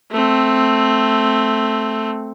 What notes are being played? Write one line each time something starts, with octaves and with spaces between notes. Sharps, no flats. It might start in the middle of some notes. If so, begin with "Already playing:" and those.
A3 C4